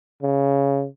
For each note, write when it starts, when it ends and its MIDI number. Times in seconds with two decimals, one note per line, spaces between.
0.23 0.86 49